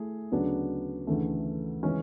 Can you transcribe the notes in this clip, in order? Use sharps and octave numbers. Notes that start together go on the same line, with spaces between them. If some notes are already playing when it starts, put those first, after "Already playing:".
Already playing: A3 E4 G#4
D2 C#3 F#3 B3 D4
D2 C#3 E3 A3
C#3 E3 G#3 C#4